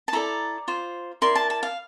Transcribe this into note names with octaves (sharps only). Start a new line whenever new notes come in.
A5
E4 A4 D5 A#5
F4 C5
E4 A#4 D5 C6
A5
A5
F5